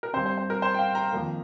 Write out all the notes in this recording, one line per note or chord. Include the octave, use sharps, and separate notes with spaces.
A#4
G2 G3 C4 C5
C5
C5
A#4
C5
G5
F5
A#5
F2 D#3 A#3